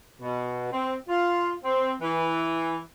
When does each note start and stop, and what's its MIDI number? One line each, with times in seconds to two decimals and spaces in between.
0.21 0.71 47
0.72 0.95 60
1.08 1.52 65
1.64 1.93 60
2.01 2.78 52